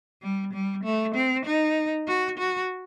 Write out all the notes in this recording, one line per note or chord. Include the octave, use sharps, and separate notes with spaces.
G3
G3
A3
C4
D#4
F#4
F#4